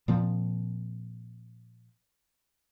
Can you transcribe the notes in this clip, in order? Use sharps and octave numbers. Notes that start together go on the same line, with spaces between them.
A#2 F3 C4